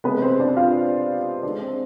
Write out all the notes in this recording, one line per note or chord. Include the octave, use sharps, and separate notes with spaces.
C3 G#3 B3 B4
C4 C5
D4 D5
F4 F5
D3 G#3 D4 D5
C4 C5